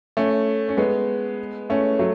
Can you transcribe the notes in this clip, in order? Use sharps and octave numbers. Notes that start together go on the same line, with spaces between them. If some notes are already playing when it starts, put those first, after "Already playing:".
A3 C#4
C#4
G#3 B3
A3 C#4
F#3 A3